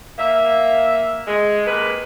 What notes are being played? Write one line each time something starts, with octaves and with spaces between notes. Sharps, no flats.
A#3 E5
G#3
C3 G#3 A#3 B4